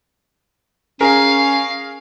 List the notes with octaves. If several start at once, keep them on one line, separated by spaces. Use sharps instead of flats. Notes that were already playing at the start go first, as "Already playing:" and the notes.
C#4 G#4 A#4 F5